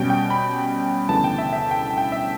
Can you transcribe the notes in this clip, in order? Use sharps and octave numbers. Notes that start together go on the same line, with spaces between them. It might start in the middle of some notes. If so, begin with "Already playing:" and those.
Already playing: B2 G3 C#4 G5
G5
B5
D2 C#3 E3 G3 B3 A5
G5
E5
E5
G5
A5
G5
E5